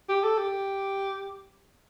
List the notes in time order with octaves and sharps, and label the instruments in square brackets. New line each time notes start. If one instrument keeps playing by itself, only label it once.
[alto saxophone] G4
A4
G4